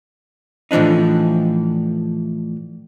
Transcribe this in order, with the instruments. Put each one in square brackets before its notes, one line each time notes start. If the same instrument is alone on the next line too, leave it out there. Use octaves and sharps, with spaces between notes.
[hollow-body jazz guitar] A2 E3 F3 D4 D#4